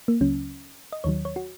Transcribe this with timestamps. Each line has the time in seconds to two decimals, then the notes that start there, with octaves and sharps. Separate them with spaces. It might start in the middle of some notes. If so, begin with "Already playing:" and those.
0.08 A#3
0.21 C#2 C#3 F#3 C#4
0.92 D#5
1.04 D#2 D#3 F#3 C#5
1.25 C#5
1.36 F#4